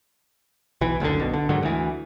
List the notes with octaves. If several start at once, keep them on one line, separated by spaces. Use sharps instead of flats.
B1 E3
F#1 D2 B2 D3
B1 B2
D3
G#2 D3 D#3 F#3
D2 E3